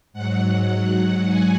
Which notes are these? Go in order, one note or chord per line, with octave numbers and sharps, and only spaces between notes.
G#2 F#3 F#5
G#5